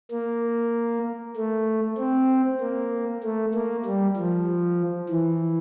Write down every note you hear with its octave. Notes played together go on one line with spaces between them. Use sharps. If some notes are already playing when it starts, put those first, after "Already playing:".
A#3
A3
C4
A#3
A3
A#3
G3
F3
E3